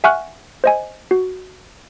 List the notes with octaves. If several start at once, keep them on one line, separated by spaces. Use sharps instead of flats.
E5 F#5 G#5 C#6 F6 F#6
C5 D#5 G#5
F#4